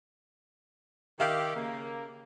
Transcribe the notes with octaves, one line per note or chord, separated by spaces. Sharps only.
D#3 G4 E5 F5
C#3 A#3